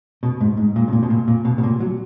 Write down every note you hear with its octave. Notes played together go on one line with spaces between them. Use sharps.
B2
G#2
G#2
A#2
B2
A#2
B2
A#2
A#2
B2
B2
A#2
F#3